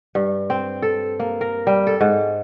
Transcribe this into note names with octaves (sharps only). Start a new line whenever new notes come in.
G2
C4
A4
A#3
A#4
G3
A4
G#2